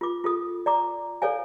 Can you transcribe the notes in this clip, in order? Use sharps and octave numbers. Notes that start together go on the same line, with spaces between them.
F4 D6
F4 A4 D#6
D5 A#5 D6
A4 C#5 D5 F5 G#5